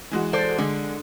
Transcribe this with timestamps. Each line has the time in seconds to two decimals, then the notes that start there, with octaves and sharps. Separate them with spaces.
0.11 E3 G#3 F#4
0.33 A4 C5 D5
0.58 D3 G#3